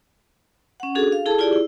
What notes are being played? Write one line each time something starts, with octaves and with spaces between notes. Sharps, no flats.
C#4 F#5
D4 F#4 G#4 A4
F5
E4 G#4 A4 A5
E4 F4 G4 G#4 D5
E4